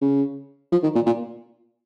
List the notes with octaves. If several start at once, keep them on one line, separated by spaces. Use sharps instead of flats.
C#3
F3
D#3
A#2
A#2